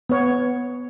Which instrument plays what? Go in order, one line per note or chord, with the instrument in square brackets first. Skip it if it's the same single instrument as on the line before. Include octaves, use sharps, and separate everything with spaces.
[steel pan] B3 C#5